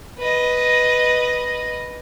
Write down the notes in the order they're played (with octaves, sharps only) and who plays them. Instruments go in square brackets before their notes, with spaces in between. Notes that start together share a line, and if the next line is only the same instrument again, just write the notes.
[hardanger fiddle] B4 D#5